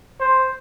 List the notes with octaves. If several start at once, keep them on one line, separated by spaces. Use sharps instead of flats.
C5